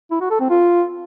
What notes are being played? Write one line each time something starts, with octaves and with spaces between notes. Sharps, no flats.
E4
F#4
A4
C4
F4